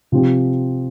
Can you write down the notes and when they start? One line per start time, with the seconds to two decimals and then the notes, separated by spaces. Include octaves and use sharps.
0.12 C3 F3 C4 G4